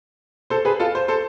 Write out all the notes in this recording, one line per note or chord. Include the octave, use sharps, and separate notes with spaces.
A4 C5
G#4 B4
F4 A4
C5
A4 C5